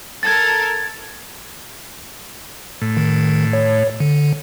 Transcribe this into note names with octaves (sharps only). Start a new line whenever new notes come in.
A4 A#4 G#6 A6
A2
D#3
C#5
D3